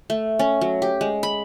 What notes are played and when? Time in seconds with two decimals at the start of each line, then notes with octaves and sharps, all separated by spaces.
0.10 A3
0.39 C#4
0.61 F#3
0.82 G4
1.01 G#3
1.23 B5